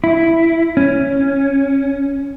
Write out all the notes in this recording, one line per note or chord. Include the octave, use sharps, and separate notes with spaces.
E4
C#4